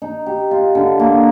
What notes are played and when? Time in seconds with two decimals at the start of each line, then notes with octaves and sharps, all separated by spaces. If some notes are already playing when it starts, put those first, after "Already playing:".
0.02 D#4
0.26 G4
0.51 F4
0.75 D3
0.99 A#3